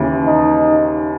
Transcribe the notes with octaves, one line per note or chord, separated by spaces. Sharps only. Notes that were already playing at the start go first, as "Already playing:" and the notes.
Already playing: D#2 C#3 E3
D#4